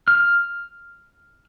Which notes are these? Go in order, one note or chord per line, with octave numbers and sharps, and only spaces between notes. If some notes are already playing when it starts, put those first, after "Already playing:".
F6